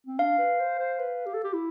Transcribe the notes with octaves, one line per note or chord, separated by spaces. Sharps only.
C4
D4 F5
B4
C5
C5
B4
G4
A4
G4
E4